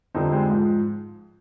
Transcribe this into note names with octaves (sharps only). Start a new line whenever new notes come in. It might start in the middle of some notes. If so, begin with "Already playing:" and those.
F2 D3 G3 C4 D#4
G#3 C4
G#2 F3